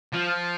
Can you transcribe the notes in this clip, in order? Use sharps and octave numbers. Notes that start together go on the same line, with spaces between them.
F3